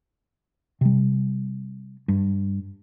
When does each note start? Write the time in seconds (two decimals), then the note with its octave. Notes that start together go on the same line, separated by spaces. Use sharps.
0.81 C3 G3
2.08 G2